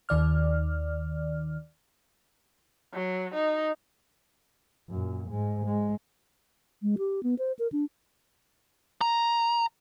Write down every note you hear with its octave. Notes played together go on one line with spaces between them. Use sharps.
D#2 D#3 D5 F6
F#3
D#4
F#2 A#2
G#2 G#3
G#3
G#3
G4
B3
C5
A#4
D4
A#5